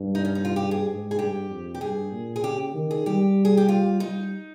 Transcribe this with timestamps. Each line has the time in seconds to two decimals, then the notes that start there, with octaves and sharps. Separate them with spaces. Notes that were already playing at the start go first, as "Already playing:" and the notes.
Already playing: G2
0.15 D#4
0.25 C#4
0.35 D#4
0.45 F4
0.56 G4
0.71 G#4
0.87 G#2
1.11 G#4
1.18 G2 G4
1.50 F2
1.75 G4
1.81 G2 G#4
2.12 A#2
2.36 G#4
2.43 C#3 G4
2.74 D#3
2.91 G#4
3.06 G3 G4
3.45 G#4
3.57 G4
3.69 F4
4.00 G3 D#4